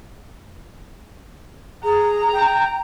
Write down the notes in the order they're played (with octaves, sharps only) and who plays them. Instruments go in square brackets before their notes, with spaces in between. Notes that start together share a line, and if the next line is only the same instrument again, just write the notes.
[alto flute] G#4 [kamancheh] A#5
[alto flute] G5